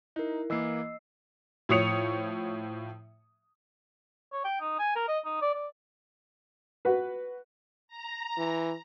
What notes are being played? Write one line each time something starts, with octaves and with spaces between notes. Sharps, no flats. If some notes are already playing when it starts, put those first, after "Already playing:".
D#4 E4 A#4
E3 A#3 D#5 E6 C7
A2 F3 C#5 D#6 C#7 F7
C#5
G5
D#4
G#5
A#4
D#5
D#4
D5
D5
F#4 B4
A#5
E3